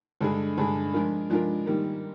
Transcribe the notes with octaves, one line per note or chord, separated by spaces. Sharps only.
G2 D3 G#3 D4 G#4
G2 D3 G#3 D4 G#4
F3 G#3 D4 F4 A#4
F3 G#3 D4 F4 A#4
G#2 D#3 G3 A#3